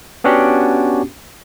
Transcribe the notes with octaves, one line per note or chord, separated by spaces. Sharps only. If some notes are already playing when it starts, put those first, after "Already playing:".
B3 C#4 D4 F#4 G4